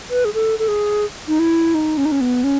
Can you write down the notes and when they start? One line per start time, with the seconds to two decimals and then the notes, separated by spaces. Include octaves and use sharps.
0.10 B4
0.25 G#4
0.34 A4
0.59 A4
0.68 G#4
1.28 D#4
1.39 E4
1.74 D#4
1.97 C#4
2.05 D#4
2.12 C#4
2.21 B3
2.44 C#4